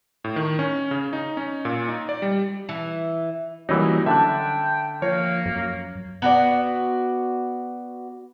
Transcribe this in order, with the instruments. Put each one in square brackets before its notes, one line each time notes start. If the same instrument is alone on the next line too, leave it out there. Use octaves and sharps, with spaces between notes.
[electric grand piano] A2
D#3
C#4
C#3
D#4
C#4
A#2
D#4
D5
G3
[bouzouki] E3
[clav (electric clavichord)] E3 D#4 [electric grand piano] F#3 G3 A#3 [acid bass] C#4
[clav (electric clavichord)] D3 [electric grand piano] E5 A5 F#6 [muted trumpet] G5
[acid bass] F3 [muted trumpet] A#3 [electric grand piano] C#5
[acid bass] F#2
[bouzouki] B3 F#4 D5